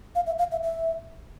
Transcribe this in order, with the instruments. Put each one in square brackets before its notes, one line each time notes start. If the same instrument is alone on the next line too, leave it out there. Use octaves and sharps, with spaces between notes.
[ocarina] F5
E5
F5
E5
E5